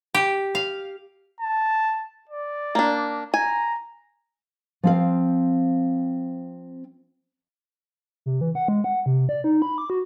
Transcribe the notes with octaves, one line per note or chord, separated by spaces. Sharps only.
G4
F5
A5
D5
A#3 D4
G#5 A#5
F3 C4 F5
C3
E3
F#5
G#3
F#5
C3
D5
D#4
B5
D6
F#4